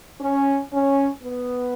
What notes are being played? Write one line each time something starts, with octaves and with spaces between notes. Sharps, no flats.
C#4
C#4
B3